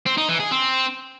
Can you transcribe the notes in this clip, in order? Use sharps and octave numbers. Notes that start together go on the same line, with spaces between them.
C4
D#4
E3
G#4
C4